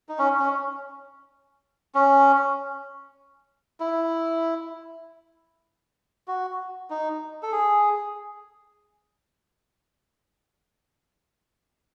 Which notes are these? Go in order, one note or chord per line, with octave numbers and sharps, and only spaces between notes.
D#4
C#4
C#4
C#4
E4
F#4
D#4
A4
G#4